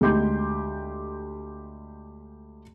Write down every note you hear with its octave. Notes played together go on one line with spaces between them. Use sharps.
D2 G#3 G4 C6 G6